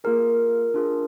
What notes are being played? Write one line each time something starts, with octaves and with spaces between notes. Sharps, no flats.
A#3 F4 G#4 A#4
D4 F4 G#4